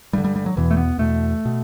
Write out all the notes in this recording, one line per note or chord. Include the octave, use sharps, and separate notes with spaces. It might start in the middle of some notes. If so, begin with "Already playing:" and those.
G2 D3 G3
G3
G3
F#3
E2 B2 E3
A3
B3
E2 B2 A3
B2